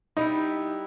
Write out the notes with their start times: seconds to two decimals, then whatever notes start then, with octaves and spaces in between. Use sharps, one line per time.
0.17 G3 B3 D#4 E4